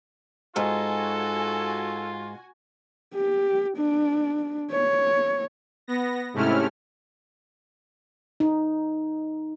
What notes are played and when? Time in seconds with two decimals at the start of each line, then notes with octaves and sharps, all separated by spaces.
0.56 G#2 F4 F#4 A4 G#5
3.14 G4
3.77 D4
4.71 C#5
5.88 B3 A#6
6.34 G#2 C3 A3 C#4 E4 F6
8.40 D#4